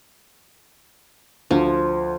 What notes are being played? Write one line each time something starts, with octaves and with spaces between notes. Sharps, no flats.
D2 F3